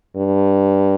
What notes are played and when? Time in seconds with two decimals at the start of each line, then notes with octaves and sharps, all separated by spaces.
0.17 G2